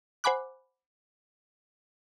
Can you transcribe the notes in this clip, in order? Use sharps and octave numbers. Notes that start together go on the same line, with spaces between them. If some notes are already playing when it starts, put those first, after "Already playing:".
C5 F#5 G#5 B5 D6 F#6